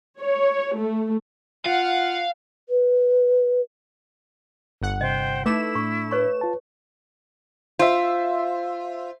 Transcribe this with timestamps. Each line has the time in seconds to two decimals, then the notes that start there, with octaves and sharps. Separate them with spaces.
0.19 C#5
0.77 A3
1.66 F4 F5 F#5
2.69 B4
4.81 G1 F#5
5.01 C3 C5 D#5 G5
5.46 A3 D#4 E4 B4 D6 E7
5.75 A2 D4 C#6
6.11 B4 C#5 C#6
6.41 F4 A5
7.79 F4 C5 E5